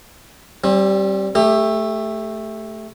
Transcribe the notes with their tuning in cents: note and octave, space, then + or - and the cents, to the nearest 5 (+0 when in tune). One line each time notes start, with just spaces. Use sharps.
G3 -15 C4 +30
A3 +0 G4 +25